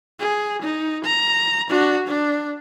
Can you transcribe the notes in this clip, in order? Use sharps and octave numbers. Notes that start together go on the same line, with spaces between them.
G#4
D#4
A#5
D4 F#4
D4